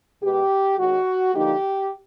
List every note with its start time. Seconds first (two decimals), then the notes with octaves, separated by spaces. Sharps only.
0.22 B2 G#3 B3 G4
0.78 D#3 G#3 C#4 F#4
1.33 D3 F3 A#3 D#4 G4